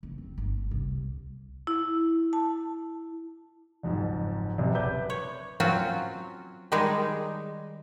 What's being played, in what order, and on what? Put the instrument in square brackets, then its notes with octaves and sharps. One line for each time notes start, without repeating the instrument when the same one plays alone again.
[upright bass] F#1
C4
G1
C2
[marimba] E4
A5
[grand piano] F#1 F2 G#2
F#1 C3
B4 D5 E5 D6 G6
[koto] C#5
F#3 C4 C#4 F4 F#4
D#3 G3 G#3 D#4 G#4